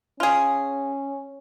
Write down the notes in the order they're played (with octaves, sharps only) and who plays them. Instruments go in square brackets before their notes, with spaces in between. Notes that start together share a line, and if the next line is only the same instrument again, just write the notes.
[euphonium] C#4 [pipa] F4 G#4